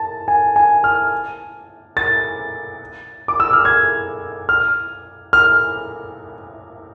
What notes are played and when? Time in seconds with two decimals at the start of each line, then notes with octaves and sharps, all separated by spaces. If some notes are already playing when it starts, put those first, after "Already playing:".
Already playing: A5
0.28 G#5
0.56 G#5
0.84 F6
1.97 A6
3.28 D6
3.40 E6
3.53 F6
3.65 G#6
4.49 F6
5.33 F6